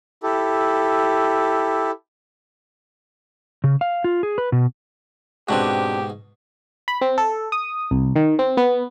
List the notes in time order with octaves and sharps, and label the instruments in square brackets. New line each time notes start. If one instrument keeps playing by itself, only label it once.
[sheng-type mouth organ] E4 G4 A4
[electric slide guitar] C#3
F5
F4
G#4
B4
B2
[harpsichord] G#2 B2 [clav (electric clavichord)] C4 D4 F#4 [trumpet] G4
[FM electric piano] B5
C4
A4
D#6
C2
D#3
C4
B3